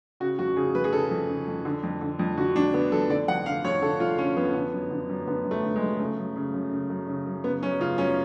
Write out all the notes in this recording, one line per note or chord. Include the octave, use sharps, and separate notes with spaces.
C#3 F#4
F2 F#4
C#3 G#4
F2 B4
G#4
C#3 A4
F2
C#3
F2
D3
F2
D3
F2
D3 F#4
F2 D4
D3 B3
F2 A4
D3 D5
F2 F#5
D3 F5
F2 C#5
D3 A4
F2 F4
D3 C#4
F2 B3
D3
F#2
D3
F#2
D3 B3
F#2
A3
D3
G#3
F#2
C#3 A3
F#2
C#3
F#2
C#3
F#2
C#3
F#2
C#3 B3
F#2 C#4
C#3 F4
F#2 C#4